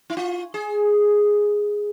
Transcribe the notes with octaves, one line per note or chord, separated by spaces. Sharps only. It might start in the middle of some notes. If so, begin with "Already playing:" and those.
E4
F4
G#4